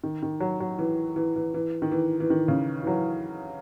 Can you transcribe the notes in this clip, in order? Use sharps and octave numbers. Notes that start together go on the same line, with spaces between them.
D#3
D#3
F#3
F#3
E3
E3
E3
E3
D#3
E3
E3
D#3
C#3
E3
F#3